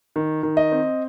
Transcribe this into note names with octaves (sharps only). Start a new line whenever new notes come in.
D#3
D#3
D#5
C4